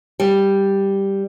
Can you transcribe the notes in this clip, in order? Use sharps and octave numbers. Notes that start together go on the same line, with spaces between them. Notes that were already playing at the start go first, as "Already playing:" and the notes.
G3